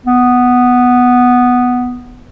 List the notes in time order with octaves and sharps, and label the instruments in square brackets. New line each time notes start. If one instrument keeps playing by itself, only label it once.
[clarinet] B3